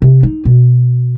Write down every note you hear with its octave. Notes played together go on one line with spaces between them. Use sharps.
C3
D#4
B2